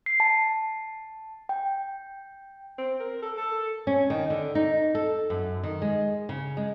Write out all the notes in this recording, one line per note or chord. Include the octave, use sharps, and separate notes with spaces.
C7
A5
G5
C4
A#4
A4
A4
C#4
D#3
D3
D#4
A4
F#2
D#3
G#3
C#3
G#3